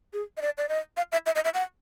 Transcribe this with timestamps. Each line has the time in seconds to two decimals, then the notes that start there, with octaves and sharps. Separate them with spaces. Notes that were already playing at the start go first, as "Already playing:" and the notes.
0.13 G#4
0.37 D#5
0.42 D5
0.58 D5
0.69 D#5
0.97 F5
1.12 E5
1.26 E5
1.35 D#5
1.44 E5
1.54 F#5